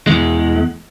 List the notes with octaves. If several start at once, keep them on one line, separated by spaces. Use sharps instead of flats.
E2 G#3